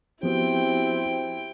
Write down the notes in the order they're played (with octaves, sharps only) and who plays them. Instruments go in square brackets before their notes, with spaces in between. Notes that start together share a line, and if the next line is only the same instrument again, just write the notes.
[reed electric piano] F3 B3 F#4 [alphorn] C4 [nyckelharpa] E4 G5 [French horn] G4